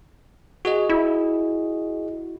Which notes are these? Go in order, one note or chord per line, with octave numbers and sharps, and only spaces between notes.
F#4 G#4 D#5
E4